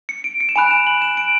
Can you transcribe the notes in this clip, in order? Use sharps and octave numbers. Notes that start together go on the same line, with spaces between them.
C#7
D7
C#7
E7
G#5 B5 F#6 D7
E7
F#7
E7
D7